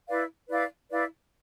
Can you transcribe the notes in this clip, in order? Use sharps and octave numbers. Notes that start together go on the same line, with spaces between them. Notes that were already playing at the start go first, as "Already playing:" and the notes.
E4 B4 D5 F5
E4 B4 D5 F5
E4 B4 D5 F5